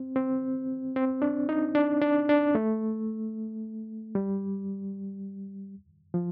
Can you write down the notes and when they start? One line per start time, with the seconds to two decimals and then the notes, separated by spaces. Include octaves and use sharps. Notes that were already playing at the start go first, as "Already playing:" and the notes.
Already playing: C4
0.16 C4
0.96 C4
1.22 D4
1.49 D#4
1.75 D4
2.02 D4
2.29 D4
2.55 A3
4.15 G3
6.14 F3